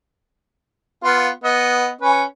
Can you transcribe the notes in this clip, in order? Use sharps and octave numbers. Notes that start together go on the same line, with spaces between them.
B3 F4 F5
B3 D#5
C#4 B4